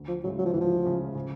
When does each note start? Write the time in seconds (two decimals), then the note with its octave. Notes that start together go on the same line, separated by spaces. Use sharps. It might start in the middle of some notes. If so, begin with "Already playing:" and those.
Already playing: D2
0.09 F3
0.24 C#3 E3 F#3 G#3
0.39 F#3
0.46 F3
0.53 D2 E3
0.61 F3
0.85 C#3 E3 G#3
1.15 C#3